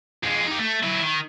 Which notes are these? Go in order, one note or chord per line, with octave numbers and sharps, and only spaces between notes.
F2 G#3
D#4 G4
A3
F#3 E4
D#3